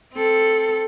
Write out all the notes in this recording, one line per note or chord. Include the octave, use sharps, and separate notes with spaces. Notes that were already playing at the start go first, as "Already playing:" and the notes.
C4 A4